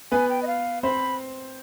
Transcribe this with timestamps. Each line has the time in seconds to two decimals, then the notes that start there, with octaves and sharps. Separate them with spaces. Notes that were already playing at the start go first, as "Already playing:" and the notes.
0.12 B3 B4 G#5
0.30 G5
0.43 D#5
0.47 F5
0.83 C4 C5 B5